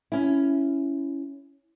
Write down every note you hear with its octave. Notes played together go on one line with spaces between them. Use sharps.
C#4 E4